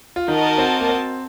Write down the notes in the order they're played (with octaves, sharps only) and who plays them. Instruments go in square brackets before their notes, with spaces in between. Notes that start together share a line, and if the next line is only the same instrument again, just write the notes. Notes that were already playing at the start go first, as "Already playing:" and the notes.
[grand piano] F4
[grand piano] D#3 D#4 [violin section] F#4 A#4 D#5 A5
[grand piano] C4
A#3
C4